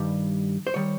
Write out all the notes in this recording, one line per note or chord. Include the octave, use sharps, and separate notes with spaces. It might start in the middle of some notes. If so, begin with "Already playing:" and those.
Already playing: G2 D#3 G3
C5
D#3 G3 C#5